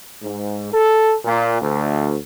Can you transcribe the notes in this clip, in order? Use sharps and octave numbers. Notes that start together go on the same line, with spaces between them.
G#2
A4
A#2
D2